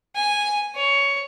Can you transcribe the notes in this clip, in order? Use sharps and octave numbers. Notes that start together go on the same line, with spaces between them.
G#5
C#5